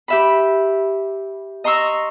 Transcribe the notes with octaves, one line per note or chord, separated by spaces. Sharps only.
G4 E5 B5
D#5 A#5 C6 C#6 E6